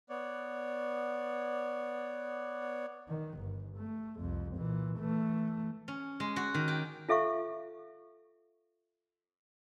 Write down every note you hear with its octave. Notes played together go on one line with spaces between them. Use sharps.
B3 C#5 D5
D#3
G1
A3
C2 F2
A#2 E3
E3 A3
C#4
G#3
F#4
D#3
G4
F4 A4 E5 F5 C#6